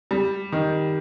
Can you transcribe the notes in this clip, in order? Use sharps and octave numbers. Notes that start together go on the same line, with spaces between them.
G3
D#3